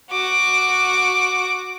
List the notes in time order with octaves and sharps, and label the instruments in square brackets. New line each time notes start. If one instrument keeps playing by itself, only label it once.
[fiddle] F#4 D6